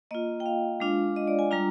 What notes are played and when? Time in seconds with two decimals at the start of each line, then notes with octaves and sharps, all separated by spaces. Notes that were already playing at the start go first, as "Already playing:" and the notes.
0.11 A#3 F4 D#5
0.40 G5
0.46 F5
0.80 G#3 D4 F4
1.16 D#5
1.27 D5
1.39 G#5
1.51 G3 D4 F4 A#5